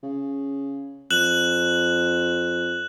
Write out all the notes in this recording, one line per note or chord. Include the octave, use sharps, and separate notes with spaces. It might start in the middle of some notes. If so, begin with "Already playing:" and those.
C#3
F2 F#6 E7 F#7